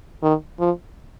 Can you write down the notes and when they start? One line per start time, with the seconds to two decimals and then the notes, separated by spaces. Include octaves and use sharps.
0.23 D#3
0.60 F3